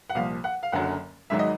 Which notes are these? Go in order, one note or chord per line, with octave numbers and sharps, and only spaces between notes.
F#5
C2 A#2 F3 F5
F#5
F5
F#1 F#2 D3 F#3 F#5
G#1 G#2 D#3 F#3 E5
D#5